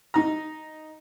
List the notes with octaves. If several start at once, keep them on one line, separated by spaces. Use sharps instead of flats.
D#4 A#5